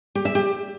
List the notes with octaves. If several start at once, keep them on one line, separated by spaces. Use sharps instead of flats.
G4
E5
G4